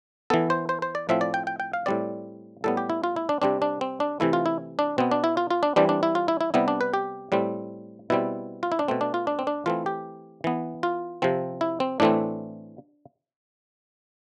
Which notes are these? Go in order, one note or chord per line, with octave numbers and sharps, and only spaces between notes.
E3 B3 A4
C5
C5
C5
D5
A2 F3 C4 E5
D5
G5
G5
G5
F5
A2 G3 C4 D5
A2 G3 B3 A4
G4
E4
F4
E4
D4
C3 G3 C4 D4
D4
C4
D4
C3 E3 A3 E4
F4
E4
D4
B2 B3 C4
D4
E4
F4
F4
D4
E3 G3 C4 D4
D4
E4
F4
E4
E4
C3 G3 B3 E4
D4
B4
G4
A2 G3 C4
B2 G3 C4 E4
F4
E4
D4
B2 A3 C4
D4
F4
D4
C4
D4
E3 A3 C4 F4
G4
E3 B3
F4
C3 F3 C4
E4
C4
A2 E3 A3 C4 D4